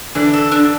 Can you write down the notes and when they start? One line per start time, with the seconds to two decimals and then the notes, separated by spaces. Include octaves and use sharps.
0.15 D3 E3 D4
0.34 A4
0.52 D4